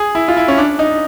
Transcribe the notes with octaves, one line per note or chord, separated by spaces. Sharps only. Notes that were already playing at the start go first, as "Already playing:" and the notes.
Already playing: G#4
E4
F4
E4
C#4
D4
D#4